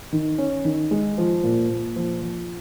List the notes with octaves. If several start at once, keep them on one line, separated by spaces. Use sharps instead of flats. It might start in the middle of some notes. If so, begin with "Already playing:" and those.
D#3
C#4
D#3
G#3
F3
A#2
A#2
F3
F3